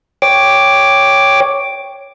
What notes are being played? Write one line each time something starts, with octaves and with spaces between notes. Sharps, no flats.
C#5 G5 D6